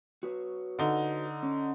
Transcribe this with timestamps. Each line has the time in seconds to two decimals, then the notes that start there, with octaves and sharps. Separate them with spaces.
0.23 F#4 B4 C#5
0.79 D3 D#4
1.43 C#4